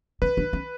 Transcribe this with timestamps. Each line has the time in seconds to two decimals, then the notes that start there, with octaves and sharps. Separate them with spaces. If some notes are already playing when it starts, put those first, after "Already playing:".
0.22 C#4 B4
0.37 D4
0.53 C#4